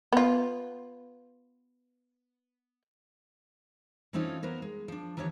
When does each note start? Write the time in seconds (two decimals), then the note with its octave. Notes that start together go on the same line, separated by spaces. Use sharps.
0.13 B3 F4
4.13 E3 A3 C4 C#4 D#4 F4
4.43 F#3 B3 A#4 C5
4.62 G#3
4.88 F3 D4
5.17 D#3 E3 B3 D4 G4 C#5